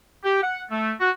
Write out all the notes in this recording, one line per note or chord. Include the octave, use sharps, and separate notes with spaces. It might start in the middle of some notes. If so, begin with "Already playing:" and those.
G4
F#5
A3
F#4